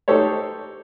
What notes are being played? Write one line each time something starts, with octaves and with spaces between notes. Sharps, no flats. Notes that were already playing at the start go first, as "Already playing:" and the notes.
D#4 G4 A4 C5 C#5